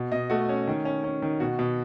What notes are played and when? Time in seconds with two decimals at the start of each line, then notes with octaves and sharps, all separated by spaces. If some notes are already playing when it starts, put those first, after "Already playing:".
Already playing: B2
0.12 B2 D#5
0.30 A3 F#4
0.49 C#4
0.68 D#3
0.85 C#4
1.04 C#4
1.22 D#3
1.40 B2 F#4
1.59 B2